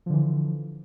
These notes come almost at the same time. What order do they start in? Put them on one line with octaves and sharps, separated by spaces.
F3 D3 E3